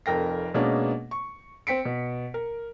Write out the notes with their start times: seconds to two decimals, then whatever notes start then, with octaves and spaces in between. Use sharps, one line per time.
0.06 F1 F2 A#4 G5 A#6
0.54 B2 G#3 A#3 C#4 D4
1.11 C#6
1.67 C4 G5 B6 C#7 D7
1.85 B2
2.34 A#4